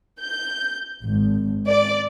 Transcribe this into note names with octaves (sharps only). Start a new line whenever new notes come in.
G6
G#1
D5